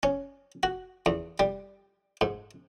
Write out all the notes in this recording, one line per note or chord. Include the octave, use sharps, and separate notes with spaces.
C#4
F#4
E2
G3
G#2